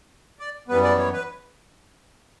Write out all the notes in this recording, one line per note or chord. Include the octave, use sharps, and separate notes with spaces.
D5
F#2 E3 G3 B3 B4
D5
C#5
B4